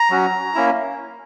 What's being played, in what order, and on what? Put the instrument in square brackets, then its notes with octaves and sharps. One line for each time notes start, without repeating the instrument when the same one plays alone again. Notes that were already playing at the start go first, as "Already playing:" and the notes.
Already playing: [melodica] A#5
F#3 C#4 F#4
A#3 C#4 E4